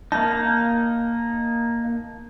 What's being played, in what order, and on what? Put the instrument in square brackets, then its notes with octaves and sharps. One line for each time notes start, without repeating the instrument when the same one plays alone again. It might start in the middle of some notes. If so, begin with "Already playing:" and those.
[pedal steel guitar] A#3 D#4 [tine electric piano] A5